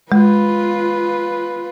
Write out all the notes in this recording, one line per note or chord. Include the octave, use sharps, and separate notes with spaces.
G#3 F4 B4